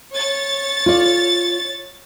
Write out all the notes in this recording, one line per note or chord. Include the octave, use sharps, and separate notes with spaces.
C#5 A6
F4 D5